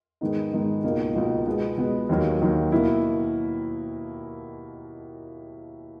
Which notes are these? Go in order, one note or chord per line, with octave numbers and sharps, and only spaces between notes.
G#2 D#3 G#3 B3 D#4
G#2 D#3 G#3 B3 D#4
C#2 B2 A#3 D#4
C#2 B2 A#3 D#4
B2 G#3 B3
B2 G#3 B3
D#2 D#3 F#3 A#3
D#2 D#3 F#3 A#3
B2 A#3 E4